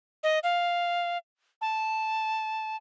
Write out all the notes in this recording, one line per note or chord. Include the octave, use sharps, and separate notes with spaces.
D#5
F5
A5